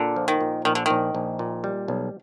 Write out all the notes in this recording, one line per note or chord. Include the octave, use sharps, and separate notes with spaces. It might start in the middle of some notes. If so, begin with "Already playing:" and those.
Already playing: A#2 D3
F3
D#3
A#2
A#1 D#3
D3
A#1 D#3
A#1
A#2
G3
B1